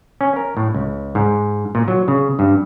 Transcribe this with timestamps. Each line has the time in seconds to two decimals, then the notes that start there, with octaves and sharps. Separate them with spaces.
0.21 C#4
0.36 A#4
0.57 A2
0.74 C#2
1.15 G#2
1.75 A#2
1.88 F#3
2.08 C#3
2.39 G2